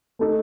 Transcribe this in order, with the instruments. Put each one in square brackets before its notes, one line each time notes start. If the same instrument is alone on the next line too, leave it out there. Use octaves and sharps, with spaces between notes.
[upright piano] A3 D#4 A4